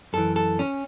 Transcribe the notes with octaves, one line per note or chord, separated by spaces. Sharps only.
F#2 E3 A4
A4
C#4